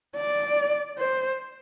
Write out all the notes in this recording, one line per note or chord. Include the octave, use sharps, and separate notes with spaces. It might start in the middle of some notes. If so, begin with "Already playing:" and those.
D5
C5